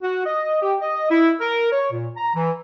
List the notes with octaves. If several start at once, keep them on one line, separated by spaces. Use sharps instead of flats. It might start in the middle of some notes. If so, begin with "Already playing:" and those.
F#4
D#5
G4
D#5
E4
A#4
C#5
A#2
A#5
E3